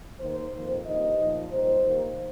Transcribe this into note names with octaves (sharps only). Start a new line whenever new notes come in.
D#2 D#3 A#3 D#4 C5
F2 D#3 A#3
G2 G3 A#3 D#4 D#5
A#2 F3 D#4
A#2 G3 D#4 C5
D#2 D#3 A#3